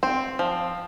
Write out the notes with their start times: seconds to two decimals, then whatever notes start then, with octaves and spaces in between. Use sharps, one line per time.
0.03 C4
0.39 F3